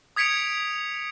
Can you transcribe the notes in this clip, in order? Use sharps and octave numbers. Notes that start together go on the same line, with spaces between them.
D#6 G#6 B6 C#7 D7 F7